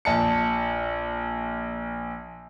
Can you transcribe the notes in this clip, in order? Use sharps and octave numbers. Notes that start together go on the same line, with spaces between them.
A#1 A5 C#7